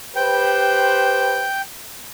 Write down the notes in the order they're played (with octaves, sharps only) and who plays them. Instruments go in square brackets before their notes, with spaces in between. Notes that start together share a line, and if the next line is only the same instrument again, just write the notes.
[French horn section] G4 B4 C5 [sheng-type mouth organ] G5